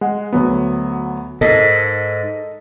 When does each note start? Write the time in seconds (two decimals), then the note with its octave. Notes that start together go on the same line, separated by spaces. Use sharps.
0.01 G#3 F#5
0.33 D2 F#3 B3
1.41 G#2 A4 A#4 D#5